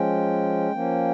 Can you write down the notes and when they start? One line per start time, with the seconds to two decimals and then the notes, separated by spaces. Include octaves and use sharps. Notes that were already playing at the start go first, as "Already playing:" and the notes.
Already playing: F3 G#3 C#4 G5
0.72 F3 A#3 C#4